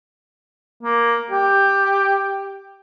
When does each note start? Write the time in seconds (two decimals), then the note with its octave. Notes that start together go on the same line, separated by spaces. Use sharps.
0.83 A#3
1.31 G4